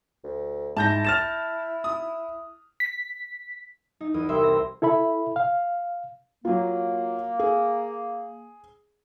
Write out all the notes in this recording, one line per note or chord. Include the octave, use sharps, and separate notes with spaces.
D2
G#2 E4 A5 G6 A#6
F6 A6 E7
D#6
B6
D#4
E2 D#6
C2 C5 E5 C6
C4 A#6
E4 A4 E5 B5
F5
F#3 A#3 F4
G#4